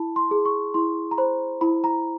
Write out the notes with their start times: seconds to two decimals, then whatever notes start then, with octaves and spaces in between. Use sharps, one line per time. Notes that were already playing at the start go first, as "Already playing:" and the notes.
Already playing: E4 A5 B5
0.16 C6
0.31 G#4
0.45 C#6
0.74 E4 C6
1.11 A#5
1.18 C5 B5
1.61 E4 B5
1.84 A#5